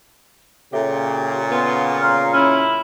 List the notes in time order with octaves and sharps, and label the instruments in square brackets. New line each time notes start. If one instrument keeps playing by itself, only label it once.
[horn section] A#2 C#3 [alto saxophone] G4 [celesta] A4 C#5 E5
[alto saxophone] B3 [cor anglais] F4
[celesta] F4 A#5 C6 [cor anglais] F5
[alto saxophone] C#4 [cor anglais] E4